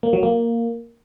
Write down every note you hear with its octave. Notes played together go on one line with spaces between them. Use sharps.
A#3
F#3
A#3